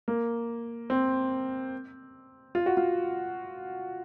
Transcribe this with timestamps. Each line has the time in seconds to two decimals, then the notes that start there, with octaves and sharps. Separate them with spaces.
0.08 A#3
0.90 C4
2.55 F4
2.66 F#4
2.77 F4